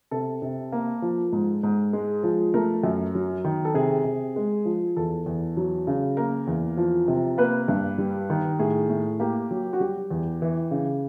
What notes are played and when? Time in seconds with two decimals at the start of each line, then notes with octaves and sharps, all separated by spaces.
0.11 C3 A4
0.42 C3
0.72 A#3
1.02 F3
1.32 G#2
1.63 G#2
1.93 G#3
2.23 F3
2.54 A3 A#4
2.84 F#2
3.15 F#3
3.44 D#3
3.65 A4
3.74 C3 G#4
4.05 C3
4.36 G#3
4.65 F3
4.97 E2 A4
5.26 E2
5.57 F#3
5.87 C#3
6.17 A#3 A#4
6.47 E2
6.77 F3
7.08 C3
7.38 A#3 B4
7.68 G2
7.98 G3
8.30 D#3
8.59 A2 G#4
8.90 A2
9.20 A#3 G4
9.51 F#3
9.73 F#4
9.80 G3 G4
10.10 E2
10.42 E3
10.71 C#3